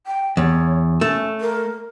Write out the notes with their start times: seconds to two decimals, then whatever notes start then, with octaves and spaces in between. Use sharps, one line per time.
0.07 G5
0.37 E2 C#5
1.01 A3 C#4
1.41 A#4